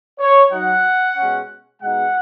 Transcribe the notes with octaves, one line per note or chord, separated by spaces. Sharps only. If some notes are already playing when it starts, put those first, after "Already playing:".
C#5
F#3 D#4 F#5
B2 G#3 C#4
B2 G#3 D#4 F#5